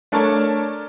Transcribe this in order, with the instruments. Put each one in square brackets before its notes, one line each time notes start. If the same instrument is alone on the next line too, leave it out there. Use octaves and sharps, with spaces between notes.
[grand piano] A3 D4 A4 A#4 C#5 A5